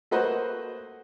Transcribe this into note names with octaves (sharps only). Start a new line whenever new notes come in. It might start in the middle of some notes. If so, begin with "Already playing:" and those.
A3 A#3 F#4 B4 C5 D#5